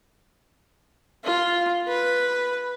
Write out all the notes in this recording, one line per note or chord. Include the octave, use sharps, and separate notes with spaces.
F4
B4